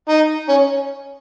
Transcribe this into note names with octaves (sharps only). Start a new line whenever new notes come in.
D#4
C#4